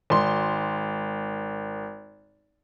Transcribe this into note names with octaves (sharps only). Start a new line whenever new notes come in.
G#1 C6